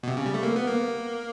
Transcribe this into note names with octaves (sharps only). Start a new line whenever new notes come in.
B2
C3
C#3
G3
A3
A#3
B3
A#3